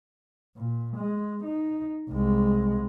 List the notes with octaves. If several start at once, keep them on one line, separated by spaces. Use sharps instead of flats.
A#2
G#3
D#4
C2 G#3